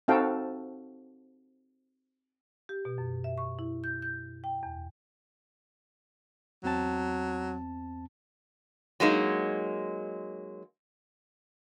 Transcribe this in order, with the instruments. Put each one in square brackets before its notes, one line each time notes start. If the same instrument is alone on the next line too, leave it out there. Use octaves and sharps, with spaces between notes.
[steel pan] C4 D#4 F#4 A4 F5 G5
[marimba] G4
B2
F#2
E5
C#6
E4
G6
G6
G5
E2
[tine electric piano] E2 C4 A5 [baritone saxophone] F#3
[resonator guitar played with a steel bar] F#3 G#3 A#3 D#4